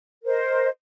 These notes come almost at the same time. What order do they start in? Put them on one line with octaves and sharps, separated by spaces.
A#4 C5 D#5